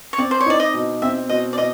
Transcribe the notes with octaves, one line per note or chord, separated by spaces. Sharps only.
C#5
C4 D5
C5
C#5
D#4 D5
D#5
B2
C4 E5
B2 D#5
D5
B2 D#5